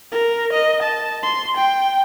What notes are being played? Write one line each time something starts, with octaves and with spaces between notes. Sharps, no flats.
A#4
D#5
A5
C6
G5